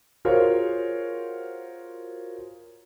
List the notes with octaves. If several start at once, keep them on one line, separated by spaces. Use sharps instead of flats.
F4 F#4 G#4 A#4 C5 C#5